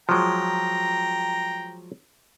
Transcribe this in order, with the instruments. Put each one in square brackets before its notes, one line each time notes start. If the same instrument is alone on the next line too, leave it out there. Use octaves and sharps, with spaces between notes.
[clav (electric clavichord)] F3 F#3 G#3 [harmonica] G5 A#5